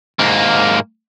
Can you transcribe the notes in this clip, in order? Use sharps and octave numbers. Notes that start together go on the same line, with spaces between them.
G#2 A#3